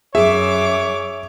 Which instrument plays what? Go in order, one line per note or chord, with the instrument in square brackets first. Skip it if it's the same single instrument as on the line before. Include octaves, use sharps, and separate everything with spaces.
[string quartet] F#2 D6 [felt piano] G#4 [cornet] C#5 [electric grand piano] E5